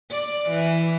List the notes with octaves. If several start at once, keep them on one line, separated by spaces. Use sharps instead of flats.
D5
E3